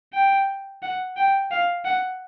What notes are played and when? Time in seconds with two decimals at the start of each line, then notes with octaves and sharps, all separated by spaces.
0.13 G5
0.83 F#5
1.16 G5
1.51 F5
1.85 F#5